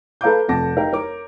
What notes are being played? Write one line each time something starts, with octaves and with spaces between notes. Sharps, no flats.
A4 B4 F5 A#5 D6 G6
F1 F2 F#5 A5 D6 A#6
D#4 G4 A#4 F5
A#4 C#5 D6